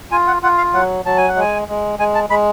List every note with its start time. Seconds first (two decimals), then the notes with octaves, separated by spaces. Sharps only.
0.11 F4 G#5
0.27 F#5
0.42 F4 F#5
0.58 F5
0.73 F#3 F#5
1.05 F#3 A5
1.17 G#5
1.28 F#5
1.36 G#3 G#5
1.68 G#3
1.99 G#3 G#5
2.15 A5
2.30 G#3 B5